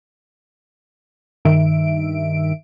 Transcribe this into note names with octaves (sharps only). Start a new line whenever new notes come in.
G2 D#3 E5 D7